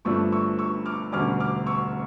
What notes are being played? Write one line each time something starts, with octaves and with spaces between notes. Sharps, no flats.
G1 G2 F3 A3 D4 C#6 E6
C#6 E6
C#6 E6
D6 F6
E1 D2 D3 G3 C#4 D6 F6
D6 F6
C#6 E6